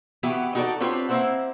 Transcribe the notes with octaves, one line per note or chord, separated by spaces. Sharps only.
E3 B3 E4 F#4 G4
D#4 F#4 G4 A4 D5
C4 D4 F4 G4 B4 C#5
A#3 C4 E4 C5 F#5